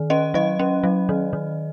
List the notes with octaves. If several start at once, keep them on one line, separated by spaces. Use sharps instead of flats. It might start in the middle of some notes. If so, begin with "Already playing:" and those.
Already playing: D#3
C#4 D#5
F#3 D#5
C#4
F#3
D#3
D#3